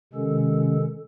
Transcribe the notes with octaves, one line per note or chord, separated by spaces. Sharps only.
C3 D#3 G#3 C#4 A4